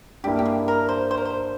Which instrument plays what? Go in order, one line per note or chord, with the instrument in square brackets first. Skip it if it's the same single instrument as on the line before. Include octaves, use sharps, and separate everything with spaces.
[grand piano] G2 G3 A#3 E4 [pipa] G4
[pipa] G4
G#4
A#4
C5
C5
A#4
C5